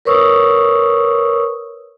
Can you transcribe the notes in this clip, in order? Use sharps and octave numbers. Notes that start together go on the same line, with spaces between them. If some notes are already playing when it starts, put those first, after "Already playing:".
A#4 B4 C#5 C#6 D#6 E6